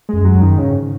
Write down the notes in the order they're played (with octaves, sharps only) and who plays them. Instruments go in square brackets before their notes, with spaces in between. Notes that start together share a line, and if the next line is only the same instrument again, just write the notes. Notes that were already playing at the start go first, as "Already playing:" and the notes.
[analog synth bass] F#2 [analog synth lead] G#3
[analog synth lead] F#3
[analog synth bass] F#2
[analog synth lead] D#3
[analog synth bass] G#2 [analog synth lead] C#3